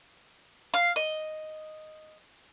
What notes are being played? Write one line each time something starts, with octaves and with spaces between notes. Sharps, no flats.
F5
D#5